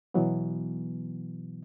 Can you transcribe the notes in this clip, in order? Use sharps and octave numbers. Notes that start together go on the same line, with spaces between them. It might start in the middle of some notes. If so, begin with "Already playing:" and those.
B2 E3 F#3 B3